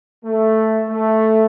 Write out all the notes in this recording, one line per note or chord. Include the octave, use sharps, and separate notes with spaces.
A3
A3